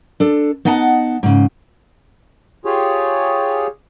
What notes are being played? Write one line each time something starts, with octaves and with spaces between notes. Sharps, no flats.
D4 A4
B3 D#4 D#5 F#5 G5 A5
G#2 C#3
F4 G4 G#4 C#5